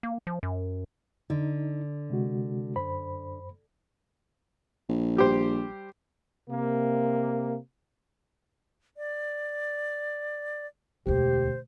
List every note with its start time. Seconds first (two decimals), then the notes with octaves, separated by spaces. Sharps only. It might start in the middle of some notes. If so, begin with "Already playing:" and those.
0.03 A#3
0.27 F3
0.43 F#2
1.30 D3 D#4
2.10 C3 G#3 F#4
2.76 F#2 C5 B5
4.89 A#1
5.16 G3 G4 C5
6.50 C3 A#3
8.97 D5
11.07 E1 D2 G4 C5